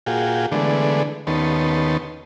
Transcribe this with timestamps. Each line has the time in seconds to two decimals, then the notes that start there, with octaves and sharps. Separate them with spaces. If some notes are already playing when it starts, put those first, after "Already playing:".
0.06 A#2 F4 F#4 G#4 G5
0.52 D3 E3 G#3 A3 B3 D4
1.27 D#2 D#3 B3 C#4 A5 C6